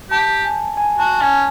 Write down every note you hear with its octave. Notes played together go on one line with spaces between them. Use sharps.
G4 A5
G#5
G#5
F#4 A5
C#4 G#5